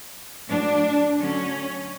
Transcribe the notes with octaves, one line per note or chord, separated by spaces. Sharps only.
A2 F#3 D4
D3 F#3 C#4